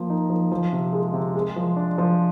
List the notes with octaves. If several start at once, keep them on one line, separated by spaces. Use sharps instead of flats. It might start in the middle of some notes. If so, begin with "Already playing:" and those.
Already playing: F3 A#3
D#4
F3
F3
C3
G#3
C3
G#3
F3
D4
F3